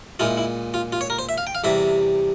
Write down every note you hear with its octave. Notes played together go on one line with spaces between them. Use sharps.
A#2 G#3 E4 F4
E4
F4
F4
C#5
A#4
C5
E5
F5
G5
F5
E2 C3 G3 E5